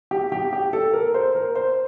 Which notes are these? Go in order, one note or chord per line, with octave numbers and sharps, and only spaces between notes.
G4
G4
G4
A4
A#4
C5
A#4
C5